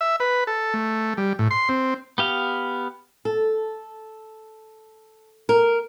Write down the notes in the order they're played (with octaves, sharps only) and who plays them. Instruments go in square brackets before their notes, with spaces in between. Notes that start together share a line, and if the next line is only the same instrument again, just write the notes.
[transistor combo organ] E5
B4
A4
A3
G3
A2
C6
C4
[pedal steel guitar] B3 G4 F5
[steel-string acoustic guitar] A4
A#4